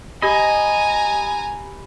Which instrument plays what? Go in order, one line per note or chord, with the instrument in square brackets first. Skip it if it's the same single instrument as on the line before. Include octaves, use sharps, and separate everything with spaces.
[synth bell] G4 B5 [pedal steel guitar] D#5 [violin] G#5 A#5